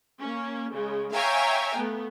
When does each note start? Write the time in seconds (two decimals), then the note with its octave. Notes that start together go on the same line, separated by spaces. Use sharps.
0.20 A#3 C#4
0.70 C#3 G#3
1.13 C#5 E5 F5 G5 G#5 A#5
1.76 A3 B3